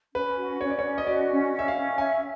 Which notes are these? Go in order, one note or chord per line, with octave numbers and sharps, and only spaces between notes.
C#4 B4
F#4
C#4 C#5
D5
C#5
C#4
D#5
F#4 D5
C#4
C#4
E5
F5
C#4
E5 G#5